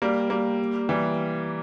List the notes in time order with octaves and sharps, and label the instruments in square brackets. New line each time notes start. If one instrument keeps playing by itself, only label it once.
[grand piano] G3 A#3
G3 A#3
E3 G3